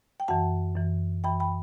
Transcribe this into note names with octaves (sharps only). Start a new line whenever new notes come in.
G5
F#2 E3 F#5 A5
F#2 E3
F#2 E3 G5 B5
G5 B5